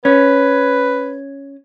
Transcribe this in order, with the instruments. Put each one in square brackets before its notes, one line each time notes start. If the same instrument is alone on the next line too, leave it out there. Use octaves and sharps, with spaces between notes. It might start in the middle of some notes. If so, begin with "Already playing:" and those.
[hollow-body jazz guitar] C#4 [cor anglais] B4